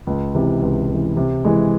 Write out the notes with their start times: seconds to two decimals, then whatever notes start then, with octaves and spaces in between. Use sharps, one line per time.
0.07 C#2
0.35 C3 E3
0.62 C#2
0.90 C3 E3
1.17 C3
1.45 E3 G#3